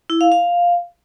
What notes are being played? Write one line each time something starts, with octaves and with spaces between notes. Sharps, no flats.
E4
F5
F5